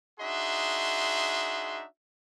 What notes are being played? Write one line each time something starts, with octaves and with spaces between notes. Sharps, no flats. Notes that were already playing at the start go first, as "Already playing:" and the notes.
D4 D#4 F#4 G#4 E5 C6